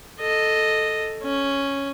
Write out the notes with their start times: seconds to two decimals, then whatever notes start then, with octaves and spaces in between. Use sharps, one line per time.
0.20 A4 D#5
1.22 C#4